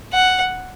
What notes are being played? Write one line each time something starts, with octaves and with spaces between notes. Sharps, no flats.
F#5